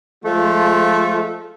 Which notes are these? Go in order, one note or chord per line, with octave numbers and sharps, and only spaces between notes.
F3 G#3 A3 F4